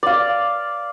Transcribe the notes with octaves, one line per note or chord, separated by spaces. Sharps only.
D5 F5